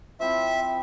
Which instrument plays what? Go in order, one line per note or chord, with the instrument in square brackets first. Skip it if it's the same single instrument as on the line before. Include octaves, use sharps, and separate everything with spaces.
[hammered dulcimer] F3 C4 E4 [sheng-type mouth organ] E5